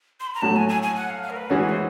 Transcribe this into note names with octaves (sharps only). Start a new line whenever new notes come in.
C6
B5
A#5
A2 F#3 A3 A5
G#5
G#5
G#5
F#5
F5
F5
A#4
B4
E3 G#3 C#4 F#4 G#4
C5